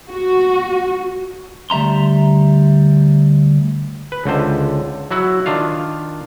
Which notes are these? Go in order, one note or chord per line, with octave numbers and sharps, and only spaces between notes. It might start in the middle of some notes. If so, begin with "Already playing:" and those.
F#4
D2 G3 E5 A#5 C6
B4
C#2 D3 C5
F#3 E4 F#4
D#3 D4 F4 F5